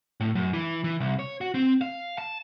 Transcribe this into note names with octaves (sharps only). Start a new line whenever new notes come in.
A2
F#2
E3
E3
C2
C#5
F#4
C4
F5
A5